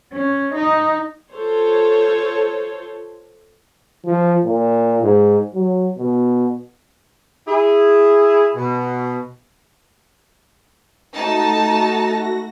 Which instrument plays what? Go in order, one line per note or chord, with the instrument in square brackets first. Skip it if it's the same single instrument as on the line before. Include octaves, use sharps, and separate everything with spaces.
[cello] C#4
D#4
[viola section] F4 A4 C5 C#5
[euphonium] F3
A#2
G#2
F#3
B2
[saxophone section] E4 G#4
B2
[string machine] A3 F#4 A#6 [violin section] D#4 A5